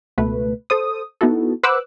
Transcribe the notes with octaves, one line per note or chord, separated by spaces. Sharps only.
C#2 B2 A3 B4
A4 C5 D#6
B3 D#4 E4 F#4 A4
B4 C5 F#5 D6 E6 F#6